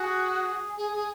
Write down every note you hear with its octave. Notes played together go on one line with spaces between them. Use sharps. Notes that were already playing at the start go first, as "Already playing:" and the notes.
Already playing: F#4 G#4
G#4
G#4